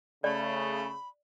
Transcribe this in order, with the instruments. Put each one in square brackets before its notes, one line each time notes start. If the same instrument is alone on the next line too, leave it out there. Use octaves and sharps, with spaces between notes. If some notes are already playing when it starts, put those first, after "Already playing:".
[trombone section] C#3 [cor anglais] A3 [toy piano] D5 [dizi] B5